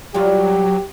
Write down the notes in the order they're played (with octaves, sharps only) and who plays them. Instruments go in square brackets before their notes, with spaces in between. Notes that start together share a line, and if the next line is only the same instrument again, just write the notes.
[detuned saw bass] F#3 [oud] G3 F4 [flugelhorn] G4